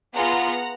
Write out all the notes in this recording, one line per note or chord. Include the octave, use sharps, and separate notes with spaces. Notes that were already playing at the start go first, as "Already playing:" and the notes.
B3 F4 G#4 F#5 A#5